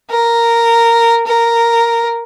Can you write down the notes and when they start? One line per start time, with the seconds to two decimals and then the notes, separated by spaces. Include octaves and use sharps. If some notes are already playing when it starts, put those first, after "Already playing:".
0.10 A#4
1.27 A#4